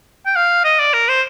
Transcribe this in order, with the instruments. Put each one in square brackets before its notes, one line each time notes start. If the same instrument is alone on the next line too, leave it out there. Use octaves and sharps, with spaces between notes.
[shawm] G5
F5
D#5
D5
A#4
C5